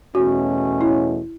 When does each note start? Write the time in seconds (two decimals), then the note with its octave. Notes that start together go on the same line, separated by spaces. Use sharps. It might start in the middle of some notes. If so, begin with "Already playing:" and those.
0.15 E2 B2 A3 C#4 F#4
0.81 E4